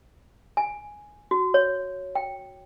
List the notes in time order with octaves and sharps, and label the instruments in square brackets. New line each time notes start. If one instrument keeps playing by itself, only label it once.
[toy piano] G#5
F#4
C#5
G5